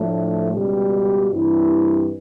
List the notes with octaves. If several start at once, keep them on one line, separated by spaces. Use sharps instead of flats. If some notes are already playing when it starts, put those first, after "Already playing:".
Already playing: A2 F3 A3 D4
C#2 B2 G3
G2 E3 G3 C4 E4